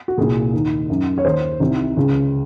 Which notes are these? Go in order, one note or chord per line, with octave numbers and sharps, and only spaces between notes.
F#4
C2 A#2 G#4
D#2 D#3
F#2 D#3
C#5
D#2 D#3 C5
C2 C3 D#3
C#2 C#3